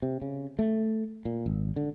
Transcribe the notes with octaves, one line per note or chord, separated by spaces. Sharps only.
C3
C#3
A3
A#2
G#1
D3